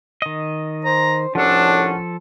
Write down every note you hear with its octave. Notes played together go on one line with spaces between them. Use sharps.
D#3 D#5
C5 A#5
C2 A2 F3 C#4 D4 A4 F#5